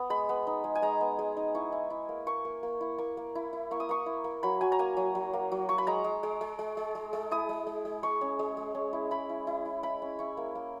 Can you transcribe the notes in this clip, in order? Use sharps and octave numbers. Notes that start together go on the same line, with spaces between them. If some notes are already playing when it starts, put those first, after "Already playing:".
Already playing: B3
G#3 B5
B3
D#4
G#3
G#5
G#3 A#5
B3
G#3
D#4
E4 C#6
E4
E4
A#3
A#3 C#6
A#3
A#3
E4
A#3 C#6
A#3
E4
E4
A#3 C#6
D#6
A#3 C#6
E4
A#3
F#3 B5
F#3 G#5
A#5
A#3 G#5
F#3
F#3
A#3
F#3
F#3 C#6
B5
G#3 A#5
G#3
G#3
G#3
G#3
G#3
G#3
G#3
E4 D#6
G#3
G#3
G#3
G#3 C#6
C#4
G#3
G#3
C#4
E4
E4 B5
E4
E4
E4
E4 B5
C#4
E4 C#6
A#3
A#3